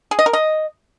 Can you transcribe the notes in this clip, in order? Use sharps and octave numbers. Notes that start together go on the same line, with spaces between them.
G#4
D#5
A#4
D#5